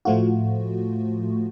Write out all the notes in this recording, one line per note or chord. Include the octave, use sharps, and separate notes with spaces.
A2 F3 A3 F4 F#4